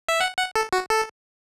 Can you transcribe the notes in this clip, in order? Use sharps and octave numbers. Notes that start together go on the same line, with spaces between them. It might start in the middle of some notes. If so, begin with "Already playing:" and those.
E5
F#5
F#5
A4
F#4
A4